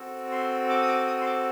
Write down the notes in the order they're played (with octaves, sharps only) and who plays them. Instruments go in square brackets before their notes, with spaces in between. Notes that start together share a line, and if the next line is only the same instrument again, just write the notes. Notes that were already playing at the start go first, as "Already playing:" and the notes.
Already playing: [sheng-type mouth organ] C4 F#4 A4
C6
D6
D#6
D6
D#6
C6
D6